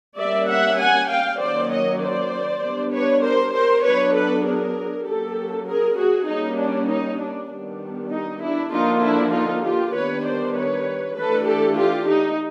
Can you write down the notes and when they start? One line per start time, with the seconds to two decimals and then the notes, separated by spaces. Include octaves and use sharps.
0.17 G3 A#3 C#4 D5 E5
0.47 E5 F#5
0.79 F#5 G#5
1.08 F5 G5
1.40 D#3 F#3 A#3 C#4 C5 D5
1.70 C#5 D#5
2.00 C5 D5
2.61 G3 B3 D4
2.92 B4 C#5
3.23 A#4 C5
3.53 A#4 C5
3.84 F#3 B3 D4 B4 C#5
4.14 A4 B4
4.45 G#4 A#4
5.05 F#3 A#3 C#4 G4 A4
5.66 G#4 A#4
5.97 F#4 G#4
6.27 G3 A#3 C#4 D#4
6.59 D4
6.89 D#4
7.19 D4
7.49 D#3 G3 B3 D4
8.11 D#4
8.41 D4 E4
8.72 D3 F3 A#3 D4 D#4 F4
9.02 D4 E4
9.33 D#4 F4
9.64 F4 G4
9.94 D#3 G3 B3 D4 B4 C#5
10.25 C5 D5
10.55 B4 C#5
11.16 E3 A3 D4 A4 B4
11.46 G4 A4
11.77 F4 G4
12.07 D#4